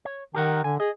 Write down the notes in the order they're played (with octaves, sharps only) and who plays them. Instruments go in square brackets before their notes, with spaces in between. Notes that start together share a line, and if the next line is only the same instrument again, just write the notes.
[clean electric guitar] C#5
[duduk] D#3 [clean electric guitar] G4 A#4 F#5
[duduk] D3 [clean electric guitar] G#5
[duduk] G#4 [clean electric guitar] D#5